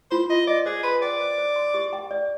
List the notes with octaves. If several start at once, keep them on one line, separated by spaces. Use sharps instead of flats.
F4 C5
F4 D#5
D5 D#5
G#4 C5
B4 C6
D5 G5
C5
C5
C6
G4
G5
D5